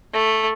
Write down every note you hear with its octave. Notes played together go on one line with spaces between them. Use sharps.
A3